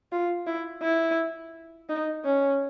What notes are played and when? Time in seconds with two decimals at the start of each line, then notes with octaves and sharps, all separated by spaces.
0.12 F4
0.47 E4
0.82 E4
1.89 D#4
2.25 C#4